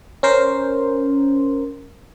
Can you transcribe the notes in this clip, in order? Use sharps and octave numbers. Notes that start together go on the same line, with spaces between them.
C#4 A#4 C5